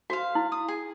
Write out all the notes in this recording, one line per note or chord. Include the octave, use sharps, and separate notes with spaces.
F#4 C5 F5
E4
D#6
G#4